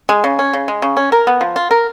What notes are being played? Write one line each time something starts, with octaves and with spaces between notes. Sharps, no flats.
G#3
C#3
C#4
C#3
G#3
C#3
C#4
A#4
B3
F3
F4
A#4